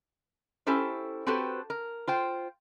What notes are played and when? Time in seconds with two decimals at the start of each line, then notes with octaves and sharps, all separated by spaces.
0.67 C#4 E4 G4 A4 C5
1.26 C4 F#4 G4 A4 B4 C5
1.70 A#4
2.07 F4 C5 G5